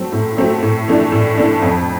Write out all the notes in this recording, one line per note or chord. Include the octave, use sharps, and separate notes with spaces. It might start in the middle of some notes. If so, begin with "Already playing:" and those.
Already playing: F#3 A3 C4
A2
F#3 A3 C4
A2
E3 A3 D4
A2
E3 A3 D4
F2